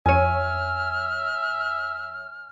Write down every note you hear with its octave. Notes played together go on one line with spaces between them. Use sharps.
F2 C#5 E5 G#5 F6 D#7